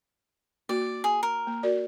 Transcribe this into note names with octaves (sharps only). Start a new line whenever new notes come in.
A#3 F#4 D5
G#4
A#4
A#3
F#4 A#4 D5